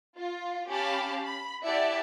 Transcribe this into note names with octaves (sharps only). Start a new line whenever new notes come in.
F4
C#4 G4 F5 A5 B5
B5
E4 G4 D5 E5 F#5 A5